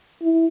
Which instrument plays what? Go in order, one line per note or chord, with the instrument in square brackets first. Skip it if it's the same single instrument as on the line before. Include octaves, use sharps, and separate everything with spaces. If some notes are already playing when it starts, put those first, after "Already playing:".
[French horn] E4